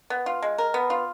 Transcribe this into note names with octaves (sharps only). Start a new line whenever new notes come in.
B3
F4
G#3
A#4
B3
F4